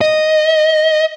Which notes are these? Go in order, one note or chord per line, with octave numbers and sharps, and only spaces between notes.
D#5